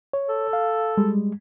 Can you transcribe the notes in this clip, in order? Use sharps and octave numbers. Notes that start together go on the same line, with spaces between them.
C#5
A4
F5
G3 G#3